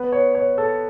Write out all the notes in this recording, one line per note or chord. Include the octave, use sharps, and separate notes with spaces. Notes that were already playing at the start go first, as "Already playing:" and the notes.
Already playing: B3 B4
C#5
C#5
A4